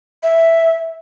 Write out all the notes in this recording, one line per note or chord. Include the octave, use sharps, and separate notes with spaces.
E5